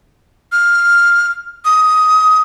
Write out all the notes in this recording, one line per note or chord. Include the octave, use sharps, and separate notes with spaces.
F6
D#6